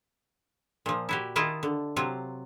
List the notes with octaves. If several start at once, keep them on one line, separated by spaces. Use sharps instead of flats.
A#2 F3
E4 F#4 G4
D#3 E4 F4 D#5 A5
D3
C3 F#3 F4